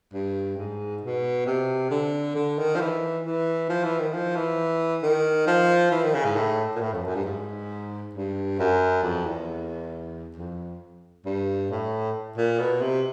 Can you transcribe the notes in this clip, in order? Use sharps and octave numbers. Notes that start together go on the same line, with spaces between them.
G2
G#2
B2
C3
D3
D3
D#3
F3
E3
E3
F3
E3
D#3
F3
E3
D#3
F3
E3
D#3
C#3
G#2
A2
A#2
A2
F2
F#2
G2
G#2
G2
F#2
F2
E2
F2
G2
A2
A#2
B2
C3